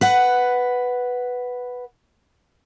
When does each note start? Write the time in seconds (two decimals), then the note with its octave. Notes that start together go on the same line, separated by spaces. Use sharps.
0.01 B4 F#5